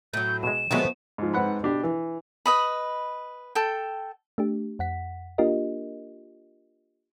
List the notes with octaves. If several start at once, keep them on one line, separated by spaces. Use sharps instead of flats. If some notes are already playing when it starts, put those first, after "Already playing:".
A2 F#3 G6
B2 G#3 E7
D#3 F3 F#3 G#3 A3 B3
G#2 F3
G#2 C4 B4 F#5 B5
B2 D4 G4
E3
B4 D#5 B5
A4 G5
A3 D4 G4
F2 F#5 B6
A#3 D4 F4 G4 A#4 D#5